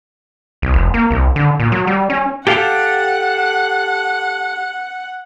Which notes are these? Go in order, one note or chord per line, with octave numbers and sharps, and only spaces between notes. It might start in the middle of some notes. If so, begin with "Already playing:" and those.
C2
F1
A#3
C2
D3
A#2
F#3
G3
C#4
G4 A4 F5 F#5